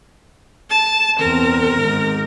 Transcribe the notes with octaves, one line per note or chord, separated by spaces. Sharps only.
A5
E2 C4 A#4
G#1 G#2